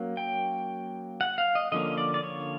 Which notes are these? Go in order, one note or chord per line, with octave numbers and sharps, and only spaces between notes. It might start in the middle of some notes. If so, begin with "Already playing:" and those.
Already playing: F#3 A#3 C#4
G5
F#5
F5
D#5
D3 F3 A#3 C#4 D#5
D5
D5
C#5